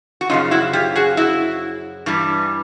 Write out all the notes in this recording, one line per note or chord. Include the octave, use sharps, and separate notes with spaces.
F#4
F#2 C#3 F3 D#4 F4
E4 F#4
F4 G4
F#4 G#4
E4 F#4
G2 E3 G3